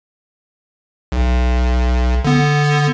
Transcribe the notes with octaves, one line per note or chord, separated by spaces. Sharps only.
B1
D3 B3